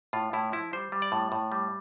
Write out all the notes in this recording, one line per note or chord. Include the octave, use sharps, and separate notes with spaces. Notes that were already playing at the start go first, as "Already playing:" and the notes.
A2 F4
A2 E4
F3 E4
G3 C5
G3
D5
A2
A2
G3